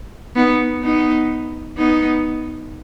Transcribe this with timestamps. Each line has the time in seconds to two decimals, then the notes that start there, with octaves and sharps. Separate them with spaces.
0.36 B3 D#4
0.83 B3 D#4
1.77 B3 D#4